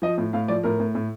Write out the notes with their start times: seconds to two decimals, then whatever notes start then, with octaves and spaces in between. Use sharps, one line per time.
0.02 F3 D#5
0.18 A2
0.33 A2 F5
0.48 F3 D5
0.64 A2 A#4
0.79 A2
0.95 A2